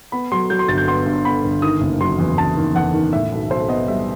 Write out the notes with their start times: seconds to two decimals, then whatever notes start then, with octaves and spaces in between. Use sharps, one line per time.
0.12 B3 B5
0.32 F#3 C6
0.50 F#3 G6
0.59 C6
0.68 G1 A6
0.78 G6
0.87 B3 C6
1.06 G2
1.25 B3 B5
1.44 G1
1.62 D#3 D#6
1.81 F#1
2.01 F#3 C6
2.19 E2
2.38 F#1 A5
2.57 D#3
2.75 E2 F#5
2.94 D#3
3.13 A2 E5
3.32 B1
3.50 B1 C5
3.68 B3 D#5
3.88 G3 E5